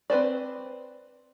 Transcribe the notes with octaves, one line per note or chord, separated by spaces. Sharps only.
C4 B4 C5 D5